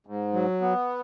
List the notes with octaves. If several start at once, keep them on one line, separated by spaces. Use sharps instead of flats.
G#2
F#3
B3